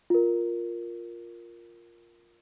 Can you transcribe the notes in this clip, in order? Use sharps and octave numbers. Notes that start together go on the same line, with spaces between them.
F4 A#4